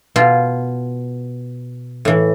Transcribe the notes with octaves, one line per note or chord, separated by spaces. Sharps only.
B2 F4
A2 E3